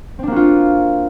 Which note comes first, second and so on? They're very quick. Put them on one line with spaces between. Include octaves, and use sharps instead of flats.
C4 D4 A#3 F#4 F4